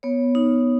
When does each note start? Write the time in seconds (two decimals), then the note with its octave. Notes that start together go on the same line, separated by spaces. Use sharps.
0.03 B3 C#5
0.35 D#4